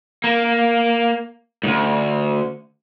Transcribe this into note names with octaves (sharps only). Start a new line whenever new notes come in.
A#3
D2 G#2